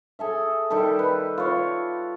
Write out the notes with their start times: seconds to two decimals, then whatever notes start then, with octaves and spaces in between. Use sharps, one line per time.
0.19 G#4 A4 E5
0.70 D#3 G3 G4 A4
0.99 B4
1.38 F4 C#5